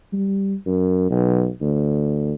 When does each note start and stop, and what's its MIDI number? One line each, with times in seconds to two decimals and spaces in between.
0.13 0.54 55
0.66 1.09 42
1.10 1.48 35
1.61 2.33 38